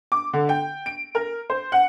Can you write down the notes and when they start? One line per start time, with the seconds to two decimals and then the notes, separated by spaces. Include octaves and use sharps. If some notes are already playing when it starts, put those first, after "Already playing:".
0.12 D6
0.33 D3
0.49 G5
0.86 D7
1.15 A#4
1.50 C5
1.72 F#5